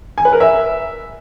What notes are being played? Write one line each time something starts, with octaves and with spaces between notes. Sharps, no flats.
G#5
B4
A#4
E5